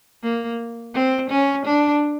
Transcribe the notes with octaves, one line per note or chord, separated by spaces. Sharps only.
A#3
C4
C#4
D4